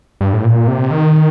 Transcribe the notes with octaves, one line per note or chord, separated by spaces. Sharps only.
G2
A2
A#2
C3
D#3